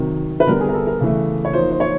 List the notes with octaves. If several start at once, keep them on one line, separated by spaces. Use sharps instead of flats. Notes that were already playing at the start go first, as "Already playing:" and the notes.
Already playing: C3 D#3 F#3
B4
D3 G3 B3 A#4
G#4
A#4
A4
A#4
C#3 E3 A3
C#5
F3 A#3 D#4 C5
C5
C#5